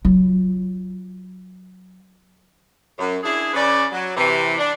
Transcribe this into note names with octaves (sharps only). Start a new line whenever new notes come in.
F#3 F4
F#2
D4 E4 G#4
C#3 C#4 B4 D5
F#3
C3 E3
D4